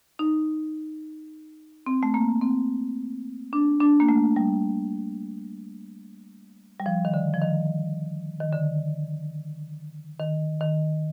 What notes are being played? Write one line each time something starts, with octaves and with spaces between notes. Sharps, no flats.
D#4
C4
A3
A#3
C4
D4
D4
A#3
A3
G3
G3
F3
D#3
D3
F3
D#3
D#3
D3
D#3
D#3